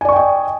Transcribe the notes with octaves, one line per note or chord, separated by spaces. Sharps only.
D5 D#5 G5 G#5 C#6